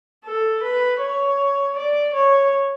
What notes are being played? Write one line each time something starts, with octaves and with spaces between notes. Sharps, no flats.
A4
B4
C#5
D5
C#5